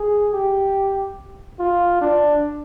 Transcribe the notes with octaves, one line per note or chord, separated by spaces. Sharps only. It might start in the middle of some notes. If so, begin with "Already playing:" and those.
Already playing: G#4
G4
F4
D4